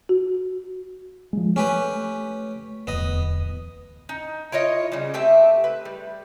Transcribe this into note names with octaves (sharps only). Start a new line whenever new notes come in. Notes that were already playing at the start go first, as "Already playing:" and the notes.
F#4
F3 G#3
A3 C#4 G4 B4
D1 E2 B3 D#5
D#4
E4 F4 C#5 D#5
C#3 G3
A3 C4 G4 E5
B4
G3